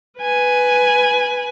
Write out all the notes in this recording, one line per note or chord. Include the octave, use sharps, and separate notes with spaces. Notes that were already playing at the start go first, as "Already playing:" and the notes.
B4 G#5